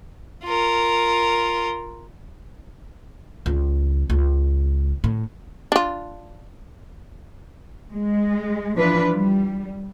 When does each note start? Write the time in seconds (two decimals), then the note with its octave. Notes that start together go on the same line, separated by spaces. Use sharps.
0.45 F4 A#4
3.46 C#2
4.10 C#2
5.04 A2
5.72 D4 F4
7.92 G#3
8.77 E3 F3 D4 F4 B4
9.11 G3